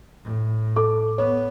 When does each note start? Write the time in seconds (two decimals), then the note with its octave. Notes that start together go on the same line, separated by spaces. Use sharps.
0.23 A2
0.76 A4 D6
1.18 B3 C#5